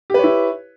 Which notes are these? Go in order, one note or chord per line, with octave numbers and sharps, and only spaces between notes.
E4 G4 B4 C#5